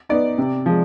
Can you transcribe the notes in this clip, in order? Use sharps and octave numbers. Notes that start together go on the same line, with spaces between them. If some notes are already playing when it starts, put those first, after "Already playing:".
B3 D#4 D5
C3
F3 G#3